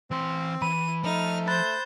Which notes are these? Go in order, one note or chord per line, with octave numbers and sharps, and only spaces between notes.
E3 C4 C6
E3 B5 D#7
F3 A3 D#4 F6
C5 B5 F#6 G6 A6